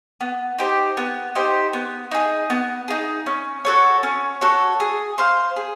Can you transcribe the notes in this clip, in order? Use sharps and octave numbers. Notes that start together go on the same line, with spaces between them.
B3
D#4 G4 C5
B3
D#4 G4 C5
B3
D#4 G#4
B3
D#4 G#4
C#4
F#4 A4 C#5
C#4
F#4 A4 C#5
G#4
C5 F5
G#4